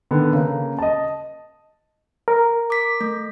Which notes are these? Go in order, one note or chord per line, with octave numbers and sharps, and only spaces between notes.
D3 D#3 B3
C#3 A#3
D#5 A5
A#4
D6 B6
A3